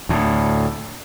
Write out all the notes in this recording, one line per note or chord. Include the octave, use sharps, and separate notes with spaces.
D2 A2